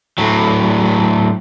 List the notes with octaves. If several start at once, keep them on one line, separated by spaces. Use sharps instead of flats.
A2 F#3